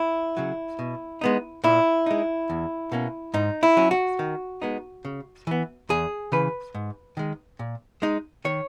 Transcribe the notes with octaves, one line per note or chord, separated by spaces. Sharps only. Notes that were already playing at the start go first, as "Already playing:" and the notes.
Already playing: E4
C#3 F#3
B2
G#3 B3 D#4
A#2 E4
G#3 D#4
E2
B2 A#3 C#4
G#2 D#4
E4
F#3 C#4
F#4
D#3
G#3 B3 D#4
C#3
E3 B3
E2 G#4
C#3 E3 B4
G#2
D#3 G#3
A#2
G#3 D#4
D#3 C#5